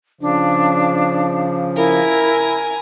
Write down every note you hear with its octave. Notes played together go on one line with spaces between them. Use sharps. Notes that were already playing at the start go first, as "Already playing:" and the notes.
C#3 F3 D4
E4 A#4 G#5